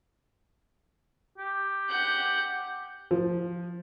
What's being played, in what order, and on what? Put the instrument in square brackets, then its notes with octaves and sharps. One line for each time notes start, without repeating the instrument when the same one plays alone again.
[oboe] G4
[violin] F#5 G6
[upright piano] F3